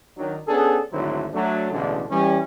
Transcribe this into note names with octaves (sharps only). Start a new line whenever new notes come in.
D#3 F#3 D4
B3 C#4 D4 G#4 A4
G#1 D2 D3 F#3 E4 C5
F#3 A3 D4
A1 B2 D3 G#3 D4 E4
E3 G3 C#4